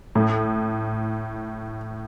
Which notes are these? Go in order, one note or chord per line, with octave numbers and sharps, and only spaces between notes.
A2